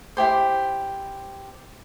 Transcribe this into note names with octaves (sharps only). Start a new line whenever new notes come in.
E4 G4 C5